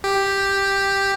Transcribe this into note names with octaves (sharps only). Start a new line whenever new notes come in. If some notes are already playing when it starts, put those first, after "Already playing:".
G4